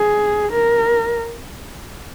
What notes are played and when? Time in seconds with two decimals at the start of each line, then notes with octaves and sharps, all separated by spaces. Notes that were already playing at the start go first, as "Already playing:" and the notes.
Already playing: G#4
0.52 A#4